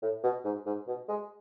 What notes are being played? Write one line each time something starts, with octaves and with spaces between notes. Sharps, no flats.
A2
B2
G#2
G#2
B2
G#3